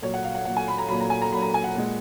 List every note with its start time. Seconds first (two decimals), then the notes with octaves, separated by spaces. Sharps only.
0.02 A#2 F#3 C#5
0.14 F#5
0.24 F5
0.35 F#5
0.45 A#2 F#3 F#5
0.57 G#5
0.68 B5
0.78 A#5
0.89 A#2 F#3 B5
1.00 A#5
1.10 G#5
1.22 A#5
1.33 A#2 F#3 B5
1.42 A#5
1.54 G#5
1.64 F#5
1.75 A#2 G#3